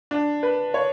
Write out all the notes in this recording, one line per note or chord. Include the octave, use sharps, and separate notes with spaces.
D4
B4
C#5